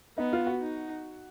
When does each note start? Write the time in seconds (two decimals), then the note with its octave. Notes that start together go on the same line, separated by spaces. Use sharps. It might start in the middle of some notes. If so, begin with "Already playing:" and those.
0.18 B3 D#4
0.33 F4
0.47 F#4
0.61 D#4